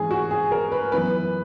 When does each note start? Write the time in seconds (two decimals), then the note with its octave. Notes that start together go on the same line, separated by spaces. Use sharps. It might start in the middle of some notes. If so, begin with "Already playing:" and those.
Already playing: G#2 E3 A#3 C#4 G#4
0.11 F#4
0.31 G#4
0.52 A#4
0.72 B4
0.92 F#2 E3 B3 B4